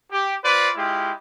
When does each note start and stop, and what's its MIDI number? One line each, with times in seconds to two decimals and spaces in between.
0.12 0.35 67
0.44 0.70 65
0.44 0.70 71
0.44 0.70 72
0.44 0.70 74
0.77 1.12 56
0.77 1.12 64
0.77 1.12 65
0.77 1.12 67